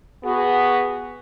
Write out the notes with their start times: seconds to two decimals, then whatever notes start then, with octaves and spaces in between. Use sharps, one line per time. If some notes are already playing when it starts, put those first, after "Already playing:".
0.24 B3 F#4 G#4